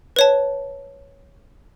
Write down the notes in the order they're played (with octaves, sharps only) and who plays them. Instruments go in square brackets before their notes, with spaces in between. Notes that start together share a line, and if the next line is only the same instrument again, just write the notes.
[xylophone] B4 C#5 A5